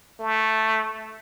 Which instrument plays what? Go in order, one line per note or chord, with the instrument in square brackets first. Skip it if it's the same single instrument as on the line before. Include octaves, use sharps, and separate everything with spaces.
[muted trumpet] A3